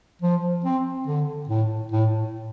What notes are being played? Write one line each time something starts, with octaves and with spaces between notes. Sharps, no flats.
F3
C4
D3
A2
A2